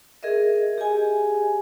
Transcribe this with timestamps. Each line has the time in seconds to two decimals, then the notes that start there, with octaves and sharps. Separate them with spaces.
0.23 G#4 A#4 D#5 E5
0.78 G4 G#4 D#5 G#5